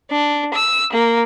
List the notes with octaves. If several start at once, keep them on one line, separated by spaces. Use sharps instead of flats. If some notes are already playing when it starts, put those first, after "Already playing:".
D4
E6
A#3